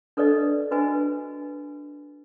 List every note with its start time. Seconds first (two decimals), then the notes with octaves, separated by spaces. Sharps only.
0.17 D4 A4 B4 D5 D#5
0.71 D4 F#4 B4 D#5 G#5